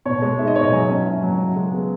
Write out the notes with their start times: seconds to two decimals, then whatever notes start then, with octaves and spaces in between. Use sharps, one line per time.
0.05 B2 C#5
0.22 G#3
0.39 D#4 E5
0.47 D#5
0.56 B2 C#5
0.64 D#5
0.72 F#3 G#5
0.90 C#4
1.06 E4
1.23 F#3
1.40 C#3
1.56 G#3
1.73 B3